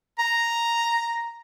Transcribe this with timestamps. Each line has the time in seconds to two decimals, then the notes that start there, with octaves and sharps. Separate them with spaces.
0.19 A#5